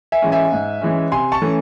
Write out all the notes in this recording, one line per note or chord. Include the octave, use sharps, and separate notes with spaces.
E5 G#5
E3 G#3 C#4
E5 G#5
G#2
E3 G#3 C#4
C3 G#5 C6
A5 C#6
E3 A3 C#4